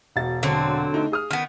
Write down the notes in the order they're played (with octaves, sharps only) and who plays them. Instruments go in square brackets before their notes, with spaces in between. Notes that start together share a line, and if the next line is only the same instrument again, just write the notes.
[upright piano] E1 F#4 A6
[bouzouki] D3 F#3 C4
[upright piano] A3 D#4
G#4 D#6 F6
[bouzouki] D#3 B3 [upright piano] F6